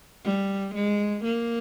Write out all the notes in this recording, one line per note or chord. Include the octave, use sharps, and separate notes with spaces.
G3
G#3
A#3